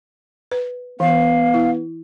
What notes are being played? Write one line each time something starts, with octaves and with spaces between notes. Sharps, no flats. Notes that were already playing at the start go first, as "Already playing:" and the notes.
B4
E3 B3 F5
E4